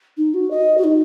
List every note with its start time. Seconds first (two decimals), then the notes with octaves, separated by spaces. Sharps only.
0.17 D#4
0.34 F#4
0.51 D#5
0.78 F#4
0.85 D#4